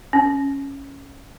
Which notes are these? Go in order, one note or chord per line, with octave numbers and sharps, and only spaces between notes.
C#4